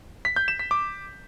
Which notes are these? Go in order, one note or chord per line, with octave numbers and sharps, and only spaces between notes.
B6
G6
E7
B6
D6